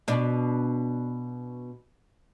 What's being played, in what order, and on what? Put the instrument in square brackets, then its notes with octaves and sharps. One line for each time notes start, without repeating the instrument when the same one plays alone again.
[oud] B2 D4